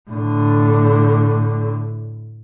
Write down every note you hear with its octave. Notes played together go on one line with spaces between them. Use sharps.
A2 D3